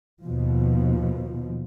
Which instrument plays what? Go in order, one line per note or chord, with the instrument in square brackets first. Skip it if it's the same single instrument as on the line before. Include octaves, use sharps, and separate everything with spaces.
[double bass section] D#2 B2 F3